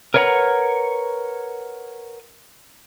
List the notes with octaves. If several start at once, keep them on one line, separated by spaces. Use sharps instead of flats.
A#4 B4 C#5 E5 F#5 A#5